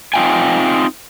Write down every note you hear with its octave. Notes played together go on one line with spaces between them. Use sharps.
C4 D#4 F4 F5 G5 G#5